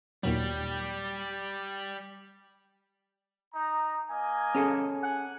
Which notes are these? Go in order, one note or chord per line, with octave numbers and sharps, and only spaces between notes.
D#2 A#2 F#3 G3
D#4 A#5
A#3 D#5 G#5
C#4 G#4 A4
F#5 G#5